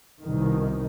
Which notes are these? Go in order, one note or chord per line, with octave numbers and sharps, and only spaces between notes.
C2 B2 D#3